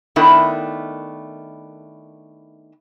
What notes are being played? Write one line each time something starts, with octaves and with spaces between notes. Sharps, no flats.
D#3 A3 B3 D4 E4 A#4